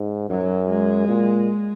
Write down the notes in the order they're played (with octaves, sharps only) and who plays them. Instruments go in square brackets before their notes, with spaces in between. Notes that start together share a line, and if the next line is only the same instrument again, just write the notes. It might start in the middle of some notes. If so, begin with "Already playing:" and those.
Already playing: [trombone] G#2
[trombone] F#2 [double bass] F#3
[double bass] G#3
[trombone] A#2